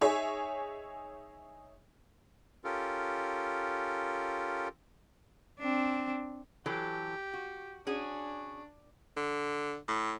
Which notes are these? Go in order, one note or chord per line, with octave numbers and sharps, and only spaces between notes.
D#4 G#4 C#5 E5 G#5
C#4 F4 G4 A4 A#4
C4 D4
E3 F#3 G4 A4
F#4
C#4 D4 F#4 G#4
D3
A2